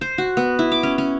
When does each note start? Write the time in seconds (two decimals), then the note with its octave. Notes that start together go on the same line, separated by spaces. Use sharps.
0.01 C5
0.18 F#4
0.37 B3
0.59 E4
0.71 D6
0.83 C#4
0.98 C#4